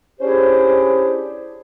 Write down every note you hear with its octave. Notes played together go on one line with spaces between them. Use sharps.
C#4 D4 E4 G4 G#4 C5